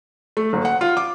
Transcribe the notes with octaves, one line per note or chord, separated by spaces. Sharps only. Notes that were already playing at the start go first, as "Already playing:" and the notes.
A3
F#1
F#5
F4
D6